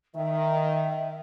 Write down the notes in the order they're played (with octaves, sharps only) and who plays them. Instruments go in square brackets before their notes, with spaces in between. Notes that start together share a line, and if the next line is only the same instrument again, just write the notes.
[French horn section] D#3 [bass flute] E5